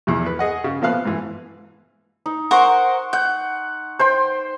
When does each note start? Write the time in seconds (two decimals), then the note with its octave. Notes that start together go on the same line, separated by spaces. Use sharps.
0.07 A#1 E2 E4
0.26 B4
0.39 G#4 D#5 F#5
0.64 C#3
0.82 A#2 F3 B3 F5 F#6
1.05 G#2 E3
2.26 D#4
2.51 A#4 C5 F#5 C6 C#6
3.13 F#5 G6
3.99 C5 G5 C6